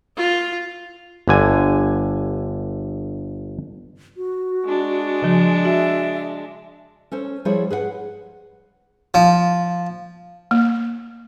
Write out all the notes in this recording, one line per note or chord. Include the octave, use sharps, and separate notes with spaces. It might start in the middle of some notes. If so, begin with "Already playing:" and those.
F4
G1 D3 G#5
F#4
G#3 D4
C#3 F3
F#4 E5
C#4 A4 C5
F3 G3 E4 G#4 C5 C#5
G#4 B4 D#5 F#5
F3
A#3